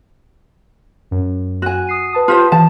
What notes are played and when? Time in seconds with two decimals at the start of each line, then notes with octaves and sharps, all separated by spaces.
1.11 F#2
1.62 F#4 G#5
1.87 D#6 C7 D#7
2.13 B4 A5 D#6
2.28 F4 G4 C5
2.52 E3 A5